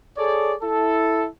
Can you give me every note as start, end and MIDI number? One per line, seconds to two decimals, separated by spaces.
0.17 0.54 68
0.17 0.54 69
0.17 0.54 73
0.17 0.54 74
0.62 1.27 64
0.62 1.27 69